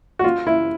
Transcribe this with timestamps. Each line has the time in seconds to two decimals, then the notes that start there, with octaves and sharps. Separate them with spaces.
0.19 F#4
0.24 F4
0.47 E4